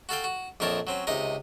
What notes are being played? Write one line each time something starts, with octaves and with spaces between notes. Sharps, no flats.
F#4 A4 F5 G5
F#4
A#1 F2 C4 A#4 C#5 A5
F#3 C4 C#4
C#2 C3 D#4 D#5